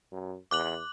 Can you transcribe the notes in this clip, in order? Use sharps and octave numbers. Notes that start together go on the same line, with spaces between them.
F#2
E2 D6 F#6 F#7